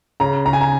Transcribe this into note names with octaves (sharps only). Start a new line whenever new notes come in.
C#3 A#5
C#3 A#5
G#5
A#5